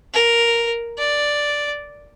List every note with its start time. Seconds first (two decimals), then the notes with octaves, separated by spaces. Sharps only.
0.14 A#4
0.98 D5